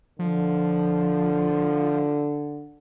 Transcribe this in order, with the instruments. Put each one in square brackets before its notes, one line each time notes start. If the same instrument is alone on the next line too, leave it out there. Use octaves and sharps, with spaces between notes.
[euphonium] D3 [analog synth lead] F3